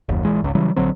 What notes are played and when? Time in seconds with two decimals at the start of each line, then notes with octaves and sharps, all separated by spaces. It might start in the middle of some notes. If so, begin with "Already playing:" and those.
0.09 F#1 D#2
0.24 A#1 E3 G#3
0.41 G#1 C#2
0.55 C#3 E3 F#3 G3
0.76 A#1 D3 F#3 C4